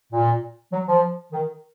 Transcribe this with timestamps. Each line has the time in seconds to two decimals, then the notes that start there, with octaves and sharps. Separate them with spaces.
0.13 A#2
0.72 F#3
0.88 F3
1.32 D#3